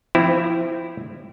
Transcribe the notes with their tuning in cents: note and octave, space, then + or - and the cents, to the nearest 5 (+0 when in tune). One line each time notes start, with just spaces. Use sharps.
F3 -20 C4 -10 E4 +0